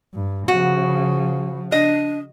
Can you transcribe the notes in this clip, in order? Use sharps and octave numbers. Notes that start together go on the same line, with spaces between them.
G2
C#3 F3 F#4
D4 D#5